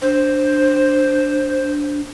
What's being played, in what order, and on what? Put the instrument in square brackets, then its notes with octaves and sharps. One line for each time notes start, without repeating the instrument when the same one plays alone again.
[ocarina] D4 [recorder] C5